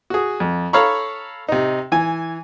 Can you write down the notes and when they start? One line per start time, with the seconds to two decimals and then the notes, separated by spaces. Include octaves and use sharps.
0.10 F#4 G#4
0.40 F2
0.73 A4 C#5 F5 A#5 B5 C#6
1.49 C3 D#4
1.92 E3 G#5